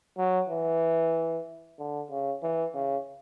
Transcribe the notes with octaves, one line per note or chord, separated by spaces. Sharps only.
F#3
E3
D3
C#3
E3
C#3